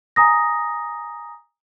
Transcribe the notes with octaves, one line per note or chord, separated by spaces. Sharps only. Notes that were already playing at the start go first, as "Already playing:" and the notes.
G#5 A#5 D#6 A#6